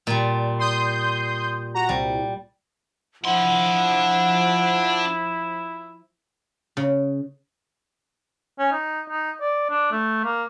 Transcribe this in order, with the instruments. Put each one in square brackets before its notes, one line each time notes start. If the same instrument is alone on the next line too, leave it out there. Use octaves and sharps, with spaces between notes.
[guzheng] A#2 G3
[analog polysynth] C6 D#6 G6
F#4 A#5
[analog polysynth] C2 [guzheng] G3
[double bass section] F3 [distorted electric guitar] D4 C6 [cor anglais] E4 [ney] F#5
[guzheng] C#3
[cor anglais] C#4
D#4
D#4
D5
D4
A3
A#3